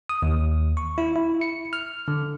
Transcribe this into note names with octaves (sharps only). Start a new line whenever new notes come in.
D#6
D#2
C#6
E4
E4
C#7
F6
D3